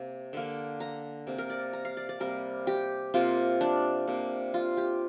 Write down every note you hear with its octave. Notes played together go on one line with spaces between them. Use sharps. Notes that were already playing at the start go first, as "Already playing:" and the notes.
Already playing: C3 A#3
D3 A#3
A#5
C3 A#3
A#4
D5
A#5
F5
D5
D5
C3 G3 A#3 A#4
G4
C3 A#3 F4
D4
C3 A#3
F4
G4